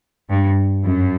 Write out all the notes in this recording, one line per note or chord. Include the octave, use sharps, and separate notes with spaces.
G2
F#2